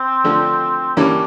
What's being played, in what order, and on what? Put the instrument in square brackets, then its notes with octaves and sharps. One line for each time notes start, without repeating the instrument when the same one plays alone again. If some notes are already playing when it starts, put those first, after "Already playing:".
Already playing: [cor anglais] C4
[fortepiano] D3 F3 A3
[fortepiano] E3 G3 A#3 C#4 [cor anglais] D4